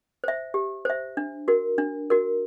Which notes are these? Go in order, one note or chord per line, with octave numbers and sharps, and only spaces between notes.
C5 E5
G4
C5 E5
D4
F#4 A#4
D4
F#4 A#4